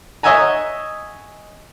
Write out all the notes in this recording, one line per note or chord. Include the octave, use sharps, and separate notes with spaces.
C#5 D#5 E5 F#5 G#5 A#5